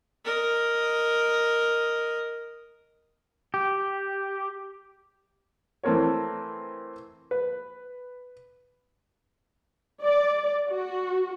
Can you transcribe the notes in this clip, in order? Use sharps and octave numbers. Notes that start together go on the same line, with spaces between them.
A#4 D#5
G4
E3 A3 C4 A#4 C#5
B4
D5
F#4